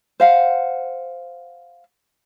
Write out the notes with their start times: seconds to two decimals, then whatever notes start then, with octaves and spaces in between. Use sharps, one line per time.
0.20 C5 F5 F#5